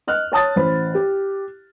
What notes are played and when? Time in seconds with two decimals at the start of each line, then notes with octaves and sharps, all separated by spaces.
0.07 D#5 F6 F#6
0.32 C#5 A5 D#6 A6
0.56 A1 C5 B5
0.95 G4